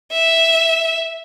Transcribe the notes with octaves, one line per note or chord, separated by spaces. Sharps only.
E5